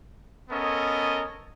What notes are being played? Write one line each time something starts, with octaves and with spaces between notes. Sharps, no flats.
B3 C#4 A4 A#4 D#5